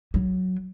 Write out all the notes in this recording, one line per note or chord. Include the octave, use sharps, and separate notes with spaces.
F#3